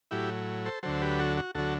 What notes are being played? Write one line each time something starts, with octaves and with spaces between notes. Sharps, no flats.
A2 F#3 E4 G4
A4 C5
D2 D3 F#3 A4 C5
G4 B4
F#4 A4
F#4
D2 D3 F#3 F#4 A4